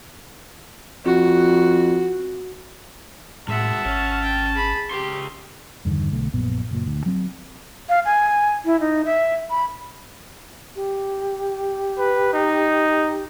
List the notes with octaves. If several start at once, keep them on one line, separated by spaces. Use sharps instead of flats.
F2 F#4
D#2 A2 G#3 E5 F#5 A5
G#1 C#4 C#5
G5
G#4 B5
C#2 G4 C6
E2 G2 D3 D#3
B1 B2 D3 A3
A#1 F#2 A#2 B3
F#1 A#2
D2
F#3 C4
F5
G#5
E4
D#4
E5
B5
G4
B4
D#4